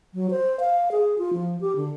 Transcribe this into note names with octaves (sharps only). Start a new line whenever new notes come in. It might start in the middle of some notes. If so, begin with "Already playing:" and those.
F#3
C5
F5
G#4
F4
F3
G4
D3